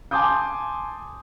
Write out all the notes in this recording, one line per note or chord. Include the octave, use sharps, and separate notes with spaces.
G#5 A5 C6 D6 D#6 G6